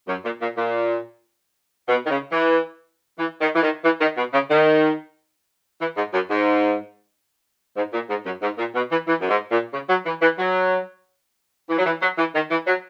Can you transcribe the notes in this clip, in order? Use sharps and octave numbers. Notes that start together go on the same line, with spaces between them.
F#2
A#2
A#2
A#2
B2
D#3
C#3
E3
E3
D#3
E3
D#3
E3
D#3
B2
C#3
D#3
E3
G#2
F#2
G#2
G#2
A#2
G#2
F#2
G#2
A#2
B2
E3
E3
F#2
G#2
A#2
C#3
F#3
E3
E3
F#3
E3
F#3
E3
F#3
E3
D#3
E3
F#3